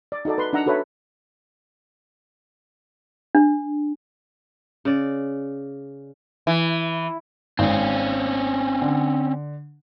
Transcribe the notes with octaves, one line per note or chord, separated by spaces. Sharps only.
D5
D#4 F#4 A4 D5
B4 C6
D4 D#4 F#5 A#5 E6
F#4 A4 B4 C#5 E5
D4
C#3 D5
E3
G#1 C4 C#4
D3